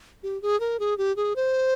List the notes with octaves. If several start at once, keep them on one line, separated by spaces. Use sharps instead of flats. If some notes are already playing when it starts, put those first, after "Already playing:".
G4
G#4
A#4
G#4
G4
G#4
C5